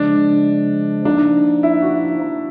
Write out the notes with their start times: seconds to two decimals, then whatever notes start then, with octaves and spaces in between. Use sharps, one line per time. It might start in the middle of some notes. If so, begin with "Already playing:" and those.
Already playing: C#3 F3 G#3 D4
1.05 F3 A#3 D4 D#4
1.63 E4
1.82 F#4